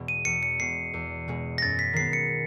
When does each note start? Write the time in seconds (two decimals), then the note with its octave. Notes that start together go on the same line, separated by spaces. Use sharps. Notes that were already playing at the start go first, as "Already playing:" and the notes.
Already playing: E2 B2 G#3
0.08 D#7
0.25 E2 C#7
0.43 C#7
0.60 B2 G#3 C7
0.94 E2
1.28 B2 G#3
1.58 A#6
1.62 F#2 A6
1.79 B6
1.93 D#3 G#3 C7
1.99 B3
2.13 C#7